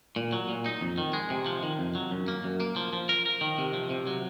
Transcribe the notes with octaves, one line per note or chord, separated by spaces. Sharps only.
A#2
F#3
A#2
D#4
F2
D#3
G#3
C3
F3
D#3
F2
F#3
F#2
A#3
F#2
A#3
F3
F3
A#4
A#4
D#3
C3
F3
C3
F#3